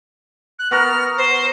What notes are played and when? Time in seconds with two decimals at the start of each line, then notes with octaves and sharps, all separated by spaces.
0.59 F#6
0.71 B3 F#4 A#4 F6
1.17 C5